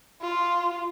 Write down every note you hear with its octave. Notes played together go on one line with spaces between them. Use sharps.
F4